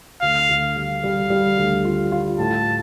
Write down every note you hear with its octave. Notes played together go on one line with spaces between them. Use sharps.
D2 F5
D2
G3 F5
G3
G3
D2
F4
F4
A2 A5